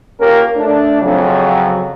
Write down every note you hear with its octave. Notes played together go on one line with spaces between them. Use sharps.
A#3 C#4 F4 G4 A#4
A3 D4
F2 C#3 F#3